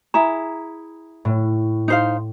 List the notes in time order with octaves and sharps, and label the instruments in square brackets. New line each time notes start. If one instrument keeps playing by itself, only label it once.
[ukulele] E4 G#4 [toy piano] A#5
[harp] A2
[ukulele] D#4 C5 F5